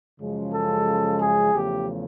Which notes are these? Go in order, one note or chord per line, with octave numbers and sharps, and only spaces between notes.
F#2 C#3 F3 G#3
A4
G#4
E2 C#3 F3 A3 G4